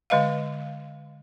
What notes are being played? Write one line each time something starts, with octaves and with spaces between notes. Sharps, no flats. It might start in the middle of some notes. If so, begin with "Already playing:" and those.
D3 G#3 B4 D#5 F5